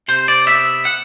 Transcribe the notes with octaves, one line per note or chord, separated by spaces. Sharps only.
C3 C5
D5
B3 E5
F#5